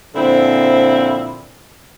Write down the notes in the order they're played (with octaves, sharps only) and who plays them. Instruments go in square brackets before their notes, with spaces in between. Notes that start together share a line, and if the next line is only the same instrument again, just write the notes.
[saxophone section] A#2 D3 F3 C4 E4